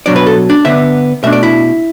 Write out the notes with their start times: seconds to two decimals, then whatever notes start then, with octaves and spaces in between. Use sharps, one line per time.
0.06 B2 F#3 D4 D5
0.16 B4
0.26 A4
0.50 D4
0.65 D3 B3 D4 E5
1.23 B2 A3 D4 E5
1.33 D5
1.43 E4